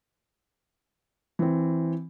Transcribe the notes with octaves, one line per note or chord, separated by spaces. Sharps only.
E3 C4